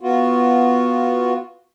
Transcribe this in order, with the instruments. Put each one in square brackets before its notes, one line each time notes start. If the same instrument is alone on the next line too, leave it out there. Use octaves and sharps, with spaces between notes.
[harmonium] B3 F4 F#4